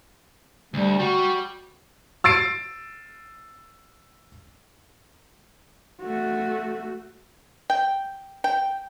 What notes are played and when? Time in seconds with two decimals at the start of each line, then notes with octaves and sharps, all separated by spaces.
0.74 D2 G3
0.99 G3 F#4
2.24 E6 A6 C7 D7
6.02 A3 F#4
7.70 G5
8.44 G5